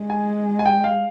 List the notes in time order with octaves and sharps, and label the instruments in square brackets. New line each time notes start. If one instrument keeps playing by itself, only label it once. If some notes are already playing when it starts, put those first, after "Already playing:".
Already playing: [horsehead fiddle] G#3
[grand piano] G#5
G#5
G5
F5